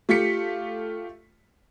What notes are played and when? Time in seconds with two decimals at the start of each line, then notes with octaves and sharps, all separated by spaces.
0.09 A3 F4 G4 B6 C#7